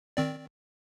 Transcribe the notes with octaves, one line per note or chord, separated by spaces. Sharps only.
D#3 C4 D5